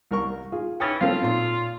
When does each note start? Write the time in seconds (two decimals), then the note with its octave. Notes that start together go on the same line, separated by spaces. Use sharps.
0.11 C2 A#4 C#6
0.52 F4 G#4
0.80 E3 C#4 G5 D#6 A6
1.01 F#3 C4 F4 A4 F5
1.22 A#2 C6